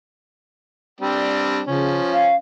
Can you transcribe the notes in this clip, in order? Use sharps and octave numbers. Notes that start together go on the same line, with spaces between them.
G3 C4 D4
C#3 F3 C#4
F5